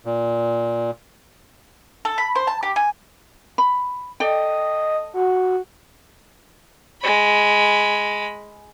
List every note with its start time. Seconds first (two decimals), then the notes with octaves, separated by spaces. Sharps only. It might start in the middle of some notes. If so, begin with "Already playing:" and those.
0.05 A#2
2.05 A4
2.18 B5
2.35 C5
2.47 A5
2.63 G4
2.76 G#5
3.58 B5
4.20 A4 D5 D#5 G5
5.14 F#4
7.02 G#3 B5